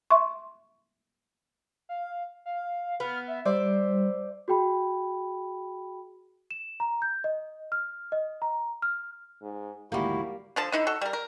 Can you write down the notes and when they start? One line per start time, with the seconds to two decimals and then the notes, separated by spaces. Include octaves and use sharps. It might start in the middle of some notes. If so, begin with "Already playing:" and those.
0.10 E5 C6 C#6
1.89 F5
2.46 F5
3.00 B3 F6
3.28 E5
3.45 G3 C5 D5 E5
4.48 F#4 G#4 G5 B5
6.51 E7
6.80 A#5
7.02 G6
7.24 D#5
7.72 F6
8.12 D#5
8.42 A#5
8.82 F6
9.42 G#2
9.92 G#1 D2 G#2 G3 A#3 E4 F#4 G4
10.56 D3 F3 A5
10.72 D3 D#4 E4
10.87 F#4 A4
11.01 G3 A#4
11.13 A#4